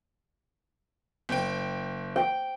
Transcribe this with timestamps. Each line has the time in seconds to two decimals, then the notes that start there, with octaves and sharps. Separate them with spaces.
1.29 F#1 G5
2.16 G5